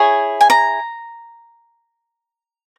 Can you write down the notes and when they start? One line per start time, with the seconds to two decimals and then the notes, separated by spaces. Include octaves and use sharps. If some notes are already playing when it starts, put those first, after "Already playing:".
Already playing: E4 G#4 C#5 G#5
0.41 G#5
0.50 A#5